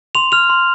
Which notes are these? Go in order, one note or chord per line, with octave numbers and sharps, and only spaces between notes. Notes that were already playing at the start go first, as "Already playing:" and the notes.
C6 F7
F6 F7
C6